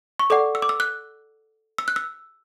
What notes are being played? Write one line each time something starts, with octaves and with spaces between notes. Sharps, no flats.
C#6
A4 D5 F#5 D6
E6
D6
E6
F#6
E6
F#6
E6